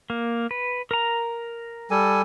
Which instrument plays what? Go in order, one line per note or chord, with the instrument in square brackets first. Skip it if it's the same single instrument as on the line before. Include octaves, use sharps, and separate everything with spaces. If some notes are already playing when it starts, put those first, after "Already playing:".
[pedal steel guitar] A#3
B4
A#4 A#5
[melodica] G3 A4 G#5